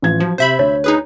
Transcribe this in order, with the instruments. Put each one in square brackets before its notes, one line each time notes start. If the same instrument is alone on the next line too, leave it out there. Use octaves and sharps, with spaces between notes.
[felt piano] A1 F3 G#6
[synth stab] F3 [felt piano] F#3
[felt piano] C3 [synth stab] C5 E5 B5
[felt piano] D2 [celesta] C#5
[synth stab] D#4 G#4 B4